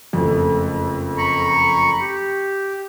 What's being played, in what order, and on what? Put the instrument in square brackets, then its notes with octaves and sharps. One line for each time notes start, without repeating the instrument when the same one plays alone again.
[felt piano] F#1 F2 A3
[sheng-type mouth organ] A#5 B5 C#6
G4